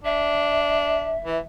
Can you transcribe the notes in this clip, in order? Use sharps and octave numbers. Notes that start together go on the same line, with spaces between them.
D4 E5
E3